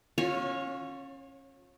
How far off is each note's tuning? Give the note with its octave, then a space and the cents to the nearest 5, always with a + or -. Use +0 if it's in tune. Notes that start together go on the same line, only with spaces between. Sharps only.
C#4 -25 F4 +35 C#5 +0